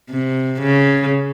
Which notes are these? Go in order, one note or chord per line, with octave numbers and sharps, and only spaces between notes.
C3
C#3